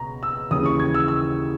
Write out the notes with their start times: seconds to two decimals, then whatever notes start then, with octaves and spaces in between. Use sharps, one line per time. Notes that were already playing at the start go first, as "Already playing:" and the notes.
Already playing: C#2 B2 A#5
0.23 E6
0.51 D#2 C#3 E3 D#6
0.66 C#6
0.80 G#6
0.94 E6
1.08 E6